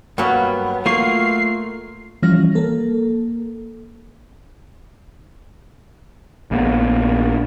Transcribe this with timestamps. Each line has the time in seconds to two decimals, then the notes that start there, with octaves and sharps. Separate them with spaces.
0.18 G2 F#3 A#3 B3 C#5
0.86 A3 A#3 F4 C#6 C7
2.22 E3 F3 G3 C#4 F6 A#6
2.55 A#3 A4
6.51 A#1 A#3 B3